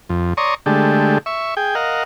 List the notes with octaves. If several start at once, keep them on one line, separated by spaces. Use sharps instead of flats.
F2
C#5 D5 A#5 C6 C#6 D#6
D3 G#3 A3 G4
E5 C#6
G#4 G5
A#4 D#5 F5 F#5